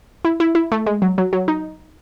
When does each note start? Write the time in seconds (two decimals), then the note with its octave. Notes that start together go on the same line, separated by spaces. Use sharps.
0.25 E4
0.40 E4
0.55 E4
0.72 A3
0.86 G#3
1.02 F#3
1.18 F#3
1.33 F#3
1.48 D#4